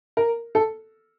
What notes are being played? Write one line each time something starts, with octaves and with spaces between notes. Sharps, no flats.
A#4
A4